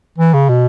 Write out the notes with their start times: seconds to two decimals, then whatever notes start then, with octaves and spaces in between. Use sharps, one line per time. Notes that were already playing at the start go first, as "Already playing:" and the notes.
0.18 E3
0.33 C#3
0.49 B2